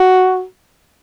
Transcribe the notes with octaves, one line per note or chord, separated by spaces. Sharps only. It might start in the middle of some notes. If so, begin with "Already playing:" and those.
Already playing: F#4